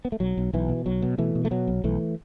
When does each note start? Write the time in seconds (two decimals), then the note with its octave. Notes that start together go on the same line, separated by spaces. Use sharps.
0.05 B3
0.12 A3
0.20 B1 F#3
0.37 B1
0.53 B1 E3
0.69 B2
0.86 B1 F#3
1.02 B2
1.18 B2 E3 A3
1.35 B2
1.45 A3
1.51 B2 F#3
1.68 B1
1.84 B1 E3 A3